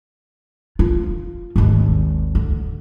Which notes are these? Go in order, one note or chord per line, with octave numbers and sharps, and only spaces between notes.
F4
G#1 D#2
D2